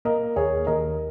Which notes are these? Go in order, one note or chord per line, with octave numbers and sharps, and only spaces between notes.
A#3 A#4 D#5
D#2 G#4 C#5
D#2 A#4 D#5